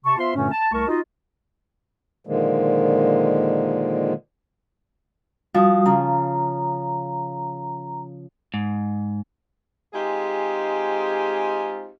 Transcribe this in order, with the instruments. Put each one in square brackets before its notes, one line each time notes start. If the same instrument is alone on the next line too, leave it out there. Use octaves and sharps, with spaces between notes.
[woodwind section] C3 A5 C#6
B3 F4 C5 E5 C6
G2 A#2 D3 A3 C#4
A5
C2 A3 A#4 A5 C#6
D#4 F4 F#4 D#5
[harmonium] A#2 D3 D#3 F3 G#3 A#3
[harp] F3 [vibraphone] G3 F#4 D#6
[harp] C#3 [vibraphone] A#5
[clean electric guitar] G#2
[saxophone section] G#3 C4 D#4 F4 G4 G#4